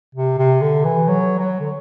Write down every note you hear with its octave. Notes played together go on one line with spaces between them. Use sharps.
C3
C3
D3
E3
F#3
F#3
D3